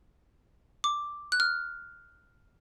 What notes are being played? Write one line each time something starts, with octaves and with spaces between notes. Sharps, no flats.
D6
F#6
F6